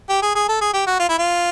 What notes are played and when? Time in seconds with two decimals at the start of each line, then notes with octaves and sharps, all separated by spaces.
0.09 G4
0.22 G#4
0.35 G#4
0.48 A4
0.61 G#4
0.74 G4
0.87 F#4
1.00 F4
1.09 E4
1.18 F4